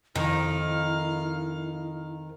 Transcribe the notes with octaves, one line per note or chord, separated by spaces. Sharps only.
F2 D#3 E4 F5